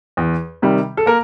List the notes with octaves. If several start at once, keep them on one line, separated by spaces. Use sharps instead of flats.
E2
C3 D#3 G3
A4
A#3 A#4